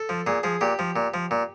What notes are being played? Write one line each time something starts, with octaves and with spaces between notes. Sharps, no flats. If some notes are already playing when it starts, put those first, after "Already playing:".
Already playing: A4
F3
A#2 G#4
F3 G#4
A#2 G4
F3
A#2
F3
A#2